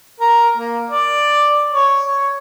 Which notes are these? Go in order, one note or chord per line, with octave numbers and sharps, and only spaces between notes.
A#4
A#3
D5
C#5